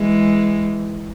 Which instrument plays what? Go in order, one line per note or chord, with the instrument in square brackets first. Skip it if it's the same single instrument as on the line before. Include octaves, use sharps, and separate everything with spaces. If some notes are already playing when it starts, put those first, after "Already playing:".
Already playing: [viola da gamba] E3 G#3